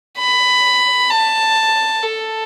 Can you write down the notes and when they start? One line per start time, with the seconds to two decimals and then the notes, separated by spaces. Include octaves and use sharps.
0.18 B5
1.10 A5
2.03 A4